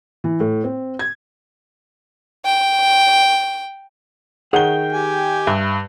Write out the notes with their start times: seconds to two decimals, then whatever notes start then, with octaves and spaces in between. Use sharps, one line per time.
0.24 E3
0.40 A2
0.64 C4
0.99 G#6
2.45 G5
4.53 D#3 G#4 C#5 F#5 G5 G7
4.93 G4 G#5
5.47 G2 E5